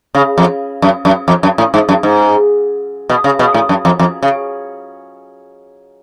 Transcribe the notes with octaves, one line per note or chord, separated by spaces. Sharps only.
C#3
F2
F#2
F#2
F2
F#2
A2
G#2
F#2
G#2
B2
C#3
B2
A2
F#2
F2
F2
C#3